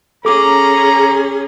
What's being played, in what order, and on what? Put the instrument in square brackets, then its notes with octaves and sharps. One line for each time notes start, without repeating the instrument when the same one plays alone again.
[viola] C#4 G#4 [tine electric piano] A4 D6 [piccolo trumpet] A#5